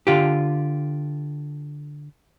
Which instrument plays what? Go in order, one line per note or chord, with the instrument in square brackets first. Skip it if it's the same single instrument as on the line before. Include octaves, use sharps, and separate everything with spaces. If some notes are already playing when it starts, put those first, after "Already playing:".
[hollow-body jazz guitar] D3 F4 G4